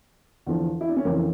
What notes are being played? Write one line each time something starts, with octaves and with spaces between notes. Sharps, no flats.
E2 D3 F3
E4
D4
C#4
F2 C#3 E3 A#3